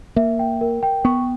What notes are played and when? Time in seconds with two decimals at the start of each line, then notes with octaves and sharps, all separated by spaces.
0.16 A#3 E5
0.39 G5
0.61 A#4
0.83 G5
1.05 B3 C#6